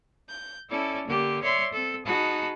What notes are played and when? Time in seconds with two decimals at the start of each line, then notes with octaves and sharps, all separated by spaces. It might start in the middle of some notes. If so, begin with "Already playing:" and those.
0.28 G6
0.70 C#4 E4 A4 D5
1.07 D3 A#3 G4
1.43 C#5 D5 E5 C6
1.73 C4 A4
2.05 D#4 F#4 G#4 A5 B5